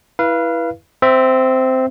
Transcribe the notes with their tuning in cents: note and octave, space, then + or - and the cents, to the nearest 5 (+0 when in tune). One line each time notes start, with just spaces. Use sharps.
E4 +0 B4 -20 F5 -30
C4 -10 E5 +0